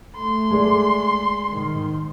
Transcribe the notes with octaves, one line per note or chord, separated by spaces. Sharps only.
A3 C6
G#3 D5
G#2 D#3